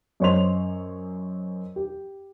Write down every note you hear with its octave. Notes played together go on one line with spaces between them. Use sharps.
F#2 C5 C#5 D#5 C6 F7
G4